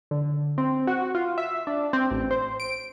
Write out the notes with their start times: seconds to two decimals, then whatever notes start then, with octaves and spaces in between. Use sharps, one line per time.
0.11 D3
0.58 C4
0.87 F#4
1.15 F4
1.38 E5
1.67 D4
1.93 C4
2.11 A1
2.31 C5
2.60 D7